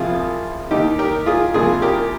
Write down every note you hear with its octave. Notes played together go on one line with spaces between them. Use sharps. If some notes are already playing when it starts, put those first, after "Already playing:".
Already playing: C2 C3 F3 F4 G#4
D#2 D#3 D#4 G4
G4 A#4
F4 G#4
C2 A#2 F3 F4 G#4
G4 A#4